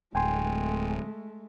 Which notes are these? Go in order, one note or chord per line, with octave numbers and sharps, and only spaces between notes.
D1 G#3 A3 G5 G#5 C6